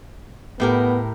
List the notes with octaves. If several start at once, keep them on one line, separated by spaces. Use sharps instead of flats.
A2 B3 G4 A#4